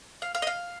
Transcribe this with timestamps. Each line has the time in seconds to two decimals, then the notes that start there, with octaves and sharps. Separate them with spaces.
0.22 F5
0.35 F5
0.42 D#5
0.47 F5